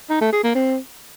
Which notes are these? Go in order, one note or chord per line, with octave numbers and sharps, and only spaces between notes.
D#4
A3
G#4
A#3
C4